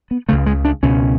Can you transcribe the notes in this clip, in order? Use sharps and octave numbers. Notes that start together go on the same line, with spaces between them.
B3
C#2 C#3 A3
G#3
D4
C#2 B2 C#4